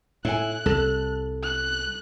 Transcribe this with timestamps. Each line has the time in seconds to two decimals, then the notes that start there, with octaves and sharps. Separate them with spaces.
0.25 A2 E4 G#5 F#6
0.66 C2 A4
1.43 F#6